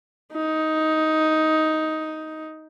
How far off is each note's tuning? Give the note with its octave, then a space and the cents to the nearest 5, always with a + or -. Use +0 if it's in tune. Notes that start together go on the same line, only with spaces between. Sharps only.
D#4 +10